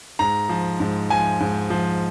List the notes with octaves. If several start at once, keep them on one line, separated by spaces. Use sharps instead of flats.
G#2 A#5
F3
G#2
F3 G#5
G#2
F3